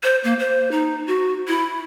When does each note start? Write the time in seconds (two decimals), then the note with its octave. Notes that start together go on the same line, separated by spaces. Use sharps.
0.03 C5
0.24 A#3
0.39 C5
0.72 D#4
1.07 F#4
1.48 E4